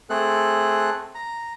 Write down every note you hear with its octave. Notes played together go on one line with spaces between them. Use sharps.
A3 C4 G#4 A4 F#6
A#5